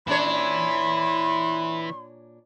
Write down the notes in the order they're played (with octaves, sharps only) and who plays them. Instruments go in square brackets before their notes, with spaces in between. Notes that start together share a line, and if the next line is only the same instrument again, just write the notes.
[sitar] A#2 D4 C#5 [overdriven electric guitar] E3 E4 [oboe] B5 [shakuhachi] C6